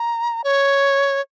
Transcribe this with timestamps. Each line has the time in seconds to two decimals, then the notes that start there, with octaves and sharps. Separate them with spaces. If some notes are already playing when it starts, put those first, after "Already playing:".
Already playing: A#5
0.44 C#5